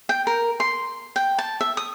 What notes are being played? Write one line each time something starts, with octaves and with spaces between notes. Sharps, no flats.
G5
A#4
C6
G5
A5
E5
D#6